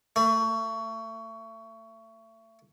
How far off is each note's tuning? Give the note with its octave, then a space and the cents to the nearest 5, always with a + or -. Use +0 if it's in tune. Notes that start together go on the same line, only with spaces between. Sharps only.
A3 +30